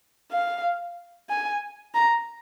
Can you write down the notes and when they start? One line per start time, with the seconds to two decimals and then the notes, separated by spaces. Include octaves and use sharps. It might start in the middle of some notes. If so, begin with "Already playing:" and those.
0.32 F5
1.30 G#5
1.95 A#5